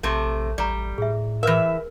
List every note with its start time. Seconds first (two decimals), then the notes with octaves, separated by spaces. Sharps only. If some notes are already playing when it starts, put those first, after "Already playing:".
0.03 A#1 C3 A3
0.58 A1 G3 D5 A#5
0.98 A2 G#4 E5
1.43 E3 A#4 B4 E5